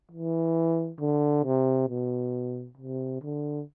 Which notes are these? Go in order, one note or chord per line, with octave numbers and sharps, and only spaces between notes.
E3
D3
C3
B2
C3
D3